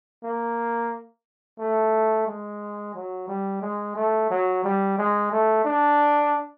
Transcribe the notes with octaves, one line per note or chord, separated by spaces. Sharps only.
A#3
A3
G#3
F#3
G3
G#3
A3
F#3
G3
G#3
A3
D4